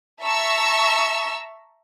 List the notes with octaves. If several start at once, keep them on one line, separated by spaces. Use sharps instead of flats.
E5 A5 A#5 C#6 E6